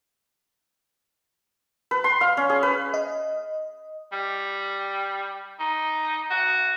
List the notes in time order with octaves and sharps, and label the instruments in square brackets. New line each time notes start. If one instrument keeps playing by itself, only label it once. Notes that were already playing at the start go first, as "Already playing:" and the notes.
[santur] B4
C6
F5
C#4
G#4
B4
[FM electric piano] D#5
[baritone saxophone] G3
D#4
F#4